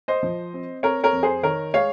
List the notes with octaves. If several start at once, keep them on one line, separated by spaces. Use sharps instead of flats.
C5 D#5
F3
C4
C4 A#4 C#5
A#4 C#5
F2
G#4 C5
D#3 A#4 C#5
G#3 C#5 F5